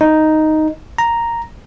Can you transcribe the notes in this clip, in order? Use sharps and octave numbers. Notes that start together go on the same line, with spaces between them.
D#4
A#5